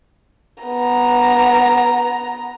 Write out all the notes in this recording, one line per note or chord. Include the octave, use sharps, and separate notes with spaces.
B3 A#5